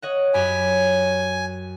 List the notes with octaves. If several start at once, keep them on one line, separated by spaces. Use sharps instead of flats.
C#5 D#5 F#5
F#2 G4 G#5 B5